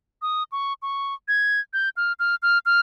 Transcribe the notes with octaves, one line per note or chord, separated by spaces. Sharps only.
D#6
C#6
C#6
G#6
G6
F6
F6
F6
F6